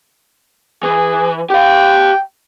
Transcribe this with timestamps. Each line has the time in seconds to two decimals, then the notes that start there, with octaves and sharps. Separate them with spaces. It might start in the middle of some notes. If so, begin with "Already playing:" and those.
0.83 E3 G#4
1.50 G4 F5 G5